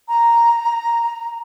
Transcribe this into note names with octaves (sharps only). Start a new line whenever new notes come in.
A#5